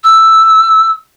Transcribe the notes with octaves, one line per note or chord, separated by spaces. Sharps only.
E6